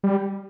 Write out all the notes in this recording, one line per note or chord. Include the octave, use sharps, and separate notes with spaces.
G3